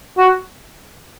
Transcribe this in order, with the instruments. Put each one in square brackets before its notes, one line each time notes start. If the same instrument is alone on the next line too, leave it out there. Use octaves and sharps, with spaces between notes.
[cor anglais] F#4